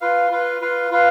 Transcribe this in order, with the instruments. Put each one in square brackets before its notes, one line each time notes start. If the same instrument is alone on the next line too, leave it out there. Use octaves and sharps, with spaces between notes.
[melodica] F4 B4 F5
F4 B4 F5
F4 B4 F5
F4 B4 F5